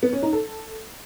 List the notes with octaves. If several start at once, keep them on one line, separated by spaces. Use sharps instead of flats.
B3
C#4
D#4
A4